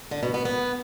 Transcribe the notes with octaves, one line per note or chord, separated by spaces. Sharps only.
D3
B2
B3
B3